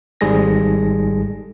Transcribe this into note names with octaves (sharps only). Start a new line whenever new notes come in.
G#1 G#2 G3 G#4 A4 A#6